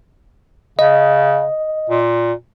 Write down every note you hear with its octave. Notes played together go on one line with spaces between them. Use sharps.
C#3 D#5
A#2